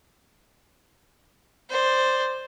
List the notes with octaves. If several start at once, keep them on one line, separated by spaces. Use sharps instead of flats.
C5 D5